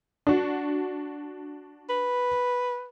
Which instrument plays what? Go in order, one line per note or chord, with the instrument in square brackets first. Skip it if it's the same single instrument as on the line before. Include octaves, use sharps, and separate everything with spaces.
[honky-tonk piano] D4 F#4
[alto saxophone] B4